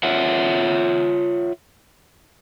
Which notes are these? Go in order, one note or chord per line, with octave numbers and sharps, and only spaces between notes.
F4 C#5 E5 F#5